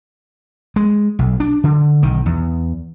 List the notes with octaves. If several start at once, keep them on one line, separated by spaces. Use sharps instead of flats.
G#3
B1
D4
D3
B1 D#3
E2